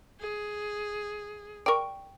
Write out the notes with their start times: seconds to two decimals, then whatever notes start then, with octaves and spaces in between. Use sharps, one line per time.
0.21 G#4
1.66 A#4 D5 G5 C#6